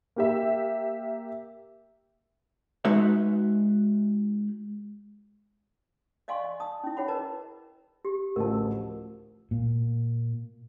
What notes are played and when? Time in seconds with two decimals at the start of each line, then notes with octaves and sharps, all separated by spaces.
0.16 A#3 G4 E5
2.85 G#3 D#4 F#4 B4 E5
6.28 D5 D#5 F5 G#5 C6 C#6
6.44 D#5
6.60 A5 D#6
6.84 C#4 E4
6.97 E4 G#4 C#5 F#5 B5
7.08 A#4 B4 D#5 A5 A#5
8.05 G4
8.36 A1 D2 F3 A#4 A5
9.51 A#2